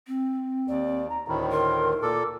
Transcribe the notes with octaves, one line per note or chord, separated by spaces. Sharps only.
C4
D#2 D5
A#5
D2 A2 D#3 B5
A#4 C6
A#2 A4 D6